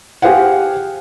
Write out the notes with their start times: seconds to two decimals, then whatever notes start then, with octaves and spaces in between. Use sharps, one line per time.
0.22 G4 G#4 C5 F5 F#5